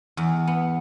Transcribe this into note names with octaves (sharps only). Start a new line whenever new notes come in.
E2
B3